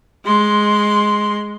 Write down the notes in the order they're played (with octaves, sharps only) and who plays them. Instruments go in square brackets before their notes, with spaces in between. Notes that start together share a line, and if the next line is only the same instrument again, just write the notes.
[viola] G#3 C6